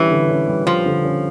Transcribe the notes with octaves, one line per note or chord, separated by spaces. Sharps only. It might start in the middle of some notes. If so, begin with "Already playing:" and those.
Already playing: D3 E3 G3 C#4 G4
D3
C#4
G3
F3 G4
D3
C#4